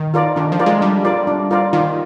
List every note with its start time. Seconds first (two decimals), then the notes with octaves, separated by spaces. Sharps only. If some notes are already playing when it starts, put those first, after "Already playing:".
Already playing: D#3
0.14 F4 A#4 D5
0.36 D#3 D4
0.52 F3
0.59 F4 A#4 D5
0.66 G#3
0.82 G3 D4
1.05 F4 A#4 D5
1.27 D4
1.51 F4 A#4 D5
1.73 D#3 F4